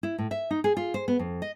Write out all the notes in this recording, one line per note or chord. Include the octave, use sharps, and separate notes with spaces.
E4
A2
E5
D#4
G#4
F4
C5
B3
F2
D#5